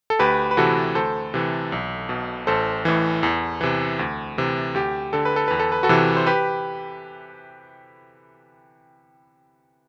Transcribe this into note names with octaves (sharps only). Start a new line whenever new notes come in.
A4
D2 G4 B4
B4
C3 E3 F#4 A4
D2 A4 C5
C3 E3
B1
B2
A1 A4 C5
A2 E3
E2
C3 E3
D2
C3 E3
D2 G4
D3 A4
B4
A4
E2 B4
A4
B4
F#4 A4
C3 E3
C5
G4 B4